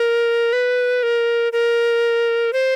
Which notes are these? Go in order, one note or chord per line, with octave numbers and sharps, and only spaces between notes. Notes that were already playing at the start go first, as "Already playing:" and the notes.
Already playing: A#4
B4
A#4
A#4
C5